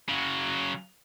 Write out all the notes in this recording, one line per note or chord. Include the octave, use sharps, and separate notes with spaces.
C#3 F#3